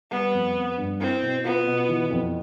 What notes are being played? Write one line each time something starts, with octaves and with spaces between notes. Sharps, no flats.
G3 B3
F2
C4
G2
C4 E4
B2
B3 F4
B2
E3
F2